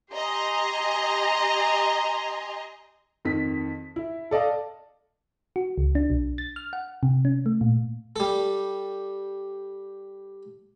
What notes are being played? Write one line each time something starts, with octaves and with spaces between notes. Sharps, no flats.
G4 D#5 G#5 A#5 C6
F2 D#3 B6
E4
A4 D5 D#5 F5
F#4
C#2
D4
B1
A6
F6
F#5
C3
C#4
A3
A#2
G3 A4